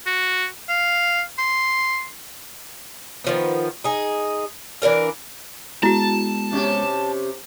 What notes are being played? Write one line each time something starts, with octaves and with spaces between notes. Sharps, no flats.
F#4
F5
C6
D#3 F3 B3
D#4 G#4
E3 D4 A#4 F5
G#3 B3 E4 F#4 A5
C3 C#4 G4